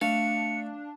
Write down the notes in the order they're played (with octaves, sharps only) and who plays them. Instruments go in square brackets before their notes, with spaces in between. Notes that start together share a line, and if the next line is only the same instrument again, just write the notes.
[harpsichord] A3 [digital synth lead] D4 [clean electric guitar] F5 [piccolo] C#7